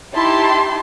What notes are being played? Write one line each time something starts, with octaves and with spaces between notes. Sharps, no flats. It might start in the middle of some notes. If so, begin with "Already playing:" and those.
D#4 E4 G4 A5 C6